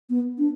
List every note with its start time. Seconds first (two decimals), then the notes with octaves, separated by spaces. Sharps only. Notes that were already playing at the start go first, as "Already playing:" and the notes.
0.10 B3
0.38 D4